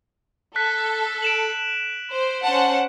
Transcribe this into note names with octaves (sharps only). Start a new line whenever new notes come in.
A4 F#6 B6
D7 E7 F#7
C5
C#4 C5 F#5 A5